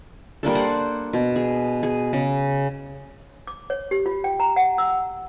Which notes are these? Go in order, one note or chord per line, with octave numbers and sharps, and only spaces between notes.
G3 A#3 D4 A4
C5 D5 F#5
B2
G#4
G#4
C#3
D6
C#5
G4
F4
G5
A#5
F#5
E6